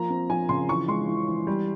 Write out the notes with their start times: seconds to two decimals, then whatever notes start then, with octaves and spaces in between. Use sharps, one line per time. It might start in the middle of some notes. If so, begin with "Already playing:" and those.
Already playing: F3 A#3 A#5
0.10 C4
0.30 F3 G#5
0.49 C#3 C6
0.69 E3 C#6
0.88 G#3 C6
1.08 E3
1.28 E3
1.47 G3